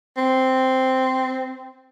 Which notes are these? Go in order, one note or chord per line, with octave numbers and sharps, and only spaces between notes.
C4